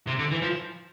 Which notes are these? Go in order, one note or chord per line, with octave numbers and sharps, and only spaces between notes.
C3
D3
E3
F3